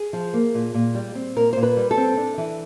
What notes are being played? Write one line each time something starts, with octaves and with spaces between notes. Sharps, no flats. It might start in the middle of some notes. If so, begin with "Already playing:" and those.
Already playing: G#4
F3
A#3
A#2
A#2
G3
C4
A#2 A#4
A#2 C5
B4
G3
A4
C4
D4
E3